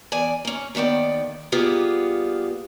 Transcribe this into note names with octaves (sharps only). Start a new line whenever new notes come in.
E2 D5 G#5
A#3 C#4
D#2 D#3 B3 D5 G5
G3 A#3 B3 F4 G4 G#4